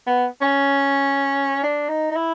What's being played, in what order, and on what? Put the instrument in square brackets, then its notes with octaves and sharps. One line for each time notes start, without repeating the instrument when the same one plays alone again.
[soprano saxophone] B3
C#4
D4
D#4
D#4
E4